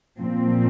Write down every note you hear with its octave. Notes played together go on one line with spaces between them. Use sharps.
A#2 F3 C4